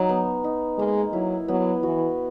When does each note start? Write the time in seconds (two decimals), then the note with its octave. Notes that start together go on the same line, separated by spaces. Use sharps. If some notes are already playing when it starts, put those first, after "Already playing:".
Already playing: F#3 D#4
0.09 B3
0.44 D#4
0.78 G#3 A#3
1.13 F#3 E4
1.48 F#3 B3
1.83 E3 F#4